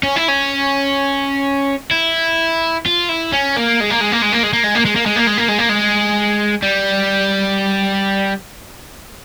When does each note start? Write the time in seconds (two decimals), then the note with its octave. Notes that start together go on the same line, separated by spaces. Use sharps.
0.03 C#4
0.16 E4
0.28 C#4
1.91 E4
2.86 F4
3.09 E4
3.32 C#4
3.56 A#3
3.80 G#3
3.90 A#3
4.00 G#3
4.12 A#3
4.22 G#3
4.32 A#3
4.43 G#3
4.53 A#3
4.64 G#3
4.75 A#3
4.85 G#3
4.96 A#3
5.06 G#3
5.16 A#3
5.27 G#3
5.37 A#3
5.48 G#3
5.58 A#3
5.69 G#3
6.62 G3